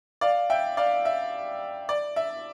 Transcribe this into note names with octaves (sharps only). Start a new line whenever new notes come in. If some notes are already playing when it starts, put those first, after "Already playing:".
D5 F5
E5 G5
D5 F5
E5
D5
E5